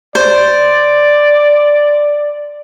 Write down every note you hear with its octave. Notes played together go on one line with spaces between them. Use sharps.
C5 D5